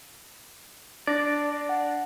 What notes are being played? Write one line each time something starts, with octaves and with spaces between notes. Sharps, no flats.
D4 D5 D6 A#6
F#5